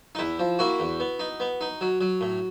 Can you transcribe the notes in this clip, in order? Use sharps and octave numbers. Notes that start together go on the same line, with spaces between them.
D#4
E2 E4
F3
A#3 E4 F#4
E2
B3
D#4
B3
D#4
F#3
F#3
A2